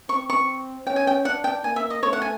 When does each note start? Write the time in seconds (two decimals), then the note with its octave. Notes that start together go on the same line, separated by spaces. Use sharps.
0.09 C4 C#6
0.30 C#6
0.87 C#4 G5
0.96 G#5
1.07 G5
1.25 D4 F#5
1.44 G5
1.64 A#3 G#5
1.76 E5
1.90 D#5
2.03 A3 C#5
2.13 F#5
2.22 G#5